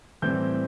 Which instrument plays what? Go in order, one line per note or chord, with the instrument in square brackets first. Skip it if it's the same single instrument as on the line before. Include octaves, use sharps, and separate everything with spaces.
[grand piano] A2 E3 G3 C4 G6